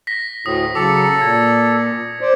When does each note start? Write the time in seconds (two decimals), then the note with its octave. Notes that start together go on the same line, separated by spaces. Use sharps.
0.07 A#6 B6
0.46 D2 A2 D#6
0.75 C#3 F#3 A4 D6 C#7
1.21 A#2 G#6
2.21 C5 D5